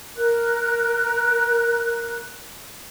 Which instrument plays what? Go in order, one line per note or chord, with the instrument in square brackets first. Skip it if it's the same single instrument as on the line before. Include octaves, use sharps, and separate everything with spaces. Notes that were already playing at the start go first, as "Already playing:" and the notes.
[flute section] A#4 F#6